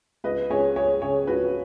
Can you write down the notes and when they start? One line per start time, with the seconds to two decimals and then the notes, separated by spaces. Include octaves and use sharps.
0.24 C#2 B4 D#5
0.50 C#2 G#4 C#5
0.76 C#2 G#4 C#5
1.02 C#3 G#4 C#5
1.27 C#2 F#4 B4
1.43 F#4